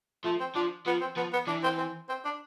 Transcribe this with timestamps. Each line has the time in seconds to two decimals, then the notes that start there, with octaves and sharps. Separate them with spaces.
0.24 F3 A3
0.40 C4
0.55 F3 D4
0.86 F3 B3
1.01 C4
1.17 F3 B3
1.33 B3
1.47 E3 D4
1.63 C4
1.78 C4
2.09 C4
2.25 D4